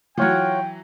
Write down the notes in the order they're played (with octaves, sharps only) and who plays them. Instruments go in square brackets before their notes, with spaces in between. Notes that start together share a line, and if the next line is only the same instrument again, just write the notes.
[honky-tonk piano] E3 F#3 [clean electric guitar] F4 C#5 F#5 [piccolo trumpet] G5